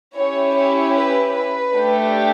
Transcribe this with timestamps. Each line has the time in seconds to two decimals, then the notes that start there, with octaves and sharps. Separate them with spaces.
0.17 C#4 E4 G4 C#5
0.57 C#5
0.96 B4
1.35 B4
1.75 A3 D4 G4